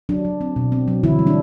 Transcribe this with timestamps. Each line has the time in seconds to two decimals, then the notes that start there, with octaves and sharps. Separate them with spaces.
0.09 F#3 D4
0.25 F#3
0.41 C4
0.56 B2
0.72 C4
0.88 F#3
1.03 D3 E3 E4
1.19 G3
1.27 D4